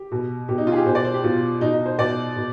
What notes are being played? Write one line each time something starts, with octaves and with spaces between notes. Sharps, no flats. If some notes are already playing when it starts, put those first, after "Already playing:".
Already playing: G4
B2
B2 G4
D#4
F4
G#4
G4
B2 C5
D5
C5
G4
B2 F4
B2 D#4
D#4
C5
B2 D5
B2